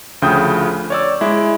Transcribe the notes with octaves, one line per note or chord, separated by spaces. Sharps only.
D2 C#3 F3 G5 D#6 G6
C#5 D5 E6
G#3 E4